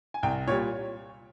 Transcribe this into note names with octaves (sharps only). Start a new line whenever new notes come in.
G#5
C2 G5
A#2 G3 C#5